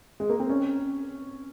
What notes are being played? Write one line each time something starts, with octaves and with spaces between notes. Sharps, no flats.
G#3
A#3
C4
C#4